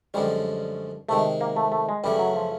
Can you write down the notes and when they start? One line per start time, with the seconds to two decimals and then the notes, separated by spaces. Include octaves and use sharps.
0.14 F#2 D3 F3 G3 G#3 C#4
1.09 C3 D#3 G#3 A3
1.41 A#3
1.56 A3
1.72 A3
1.89 G#3
2.04 F#2 C#3 E3 G3 A3
2.19 F#3
2.36 F3